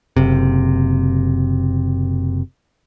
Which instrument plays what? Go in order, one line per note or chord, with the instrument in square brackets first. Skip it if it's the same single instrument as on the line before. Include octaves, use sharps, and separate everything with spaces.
[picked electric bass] F#1 C3